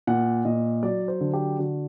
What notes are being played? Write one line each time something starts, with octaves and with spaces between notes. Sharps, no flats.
A#2 F#5
A#2 D#5
F#3 D5
C5
D3
G4
D3 F#4